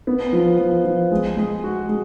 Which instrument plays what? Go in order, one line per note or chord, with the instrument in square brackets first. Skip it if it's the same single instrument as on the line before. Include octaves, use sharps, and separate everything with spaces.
[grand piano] B3
F3
F3
F3
G#3
G#3
F#4
G#3